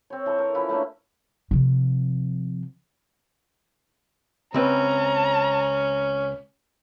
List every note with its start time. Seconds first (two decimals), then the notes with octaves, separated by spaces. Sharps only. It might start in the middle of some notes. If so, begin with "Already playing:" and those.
0.10 C4 C#5
0.26 E3 A4 C#6
0.38 A#4
0.54 F3 C#4 E4 B4
0.69 A3 A#3 D4
1.51 C3 F3
4.54 C#2 C4 C#4 B4 A#5